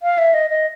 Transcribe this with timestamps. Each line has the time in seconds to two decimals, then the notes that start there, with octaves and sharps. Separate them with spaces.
0.03 F5
0.18 E5
0.34 D#5
0.50 D#5